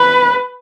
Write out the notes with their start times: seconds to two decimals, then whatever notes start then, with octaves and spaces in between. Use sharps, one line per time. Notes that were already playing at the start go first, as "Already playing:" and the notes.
Already playing: B4